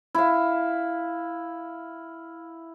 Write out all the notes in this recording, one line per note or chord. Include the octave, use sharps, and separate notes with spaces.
E4 F5